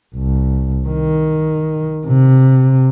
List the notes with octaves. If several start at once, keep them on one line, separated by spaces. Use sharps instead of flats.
C2
D#3
C3